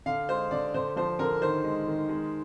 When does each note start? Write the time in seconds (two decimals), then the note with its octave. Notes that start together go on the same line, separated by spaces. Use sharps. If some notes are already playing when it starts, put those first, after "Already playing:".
0.06 D3 F5
0.29 G#3 C5
0.51 D3 D5
0.74 D3 C5
0.96 F3 C5
1.19 D3 A#4
1.42 D#3 C5
1.64 G#3
1.87 D#3
2.09 G#3